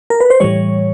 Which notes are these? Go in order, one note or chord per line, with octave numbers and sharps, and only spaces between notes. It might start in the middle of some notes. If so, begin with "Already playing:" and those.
A#4
B4
C5
A2 E3 G3 C#5